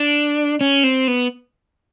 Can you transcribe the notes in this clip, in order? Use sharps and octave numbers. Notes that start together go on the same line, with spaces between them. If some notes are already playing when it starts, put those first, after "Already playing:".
Already playing: D4
C#4
C4
B3